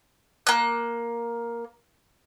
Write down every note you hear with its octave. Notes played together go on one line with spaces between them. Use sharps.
A#3 F#6